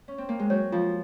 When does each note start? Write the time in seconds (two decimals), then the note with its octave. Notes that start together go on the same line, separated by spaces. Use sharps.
0.08 C#4
0.18 C4
0.29 A#3
0.39 G#3
0.50 F#3 C#5
0.72 F3 F4